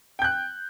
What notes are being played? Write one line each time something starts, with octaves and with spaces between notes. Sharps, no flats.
G5 F#6 G6